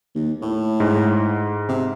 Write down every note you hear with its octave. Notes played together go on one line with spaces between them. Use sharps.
D#2
A2
G#2
C3